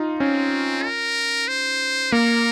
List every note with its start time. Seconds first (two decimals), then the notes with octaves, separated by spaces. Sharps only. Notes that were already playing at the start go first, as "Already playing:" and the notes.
Already playing: D#4 F4
0.20 C4 C#4
0.84 A#4
1.48 C5
2.12 A#3 A#4